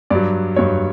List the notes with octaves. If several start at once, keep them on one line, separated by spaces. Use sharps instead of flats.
G2 F#3 D5
G2 F#3 C#5